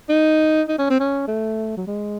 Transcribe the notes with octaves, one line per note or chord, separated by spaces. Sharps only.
D#4
D#4
C#4
C4
C#4
A3
F#3
G#3